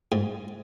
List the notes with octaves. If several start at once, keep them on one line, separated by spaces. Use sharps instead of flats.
G#2